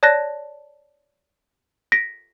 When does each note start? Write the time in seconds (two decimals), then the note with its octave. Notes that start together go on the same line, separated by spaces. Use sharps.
0.03 C#5 D5 A5 F#6 A6 A#6
1.92 A#6 B6 D7